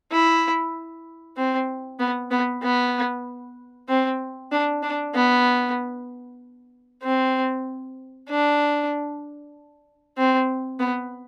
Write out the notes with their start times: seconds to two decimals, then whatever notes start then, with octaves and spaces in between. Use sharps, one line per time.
0.12 E4
1.37 C4
1.99 B3
2.31 B3
2.63 B3
3.88 C4
4.52 D4
4.83 D4
5.14 B3
7.03 C4
8.29 D4
10.17 C4
10.80 B3